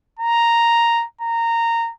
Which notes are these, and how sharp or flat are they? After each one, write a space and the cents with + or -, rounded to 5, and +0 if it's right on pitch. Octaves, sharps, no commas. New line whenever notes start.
A#5 +0
A#5 -15